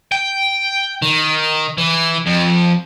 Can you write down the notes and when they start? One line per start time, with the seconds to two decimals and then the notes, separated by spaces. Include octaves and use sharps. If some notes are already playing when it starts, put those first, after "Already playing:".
0.12 G5
1.02 D#3
1.78 E3
2.26 F2